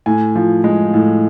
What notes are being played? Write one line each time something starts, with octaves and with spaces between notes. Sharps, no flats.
A2 G#5
F3
G#3
A2